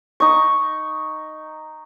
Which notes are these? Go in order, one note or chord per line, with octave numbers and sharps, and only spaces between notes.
D#4 C#6